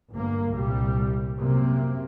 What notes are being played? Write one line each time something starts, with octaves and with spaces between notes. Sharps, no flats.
G1 A#3
C2 A#2 G3
F#2 C3 A#3